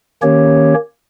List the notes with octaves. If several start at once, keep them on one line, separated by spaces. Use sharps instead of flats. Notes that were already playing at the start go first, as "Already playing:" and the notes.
D#3 A#3 C#4 G4 C#5